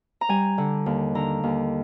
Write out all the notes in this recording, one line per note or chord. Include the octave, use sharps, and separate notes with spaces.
A#5
G3 G#5
D3
D#2
D3 A#5
D#2